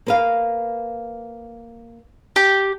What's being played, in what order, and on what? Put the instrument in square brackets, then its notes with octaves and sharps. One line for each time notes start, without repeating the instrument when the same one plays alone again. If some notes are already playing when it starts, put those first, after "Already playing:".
[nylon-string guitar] A#3 B4 F5
[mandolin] G4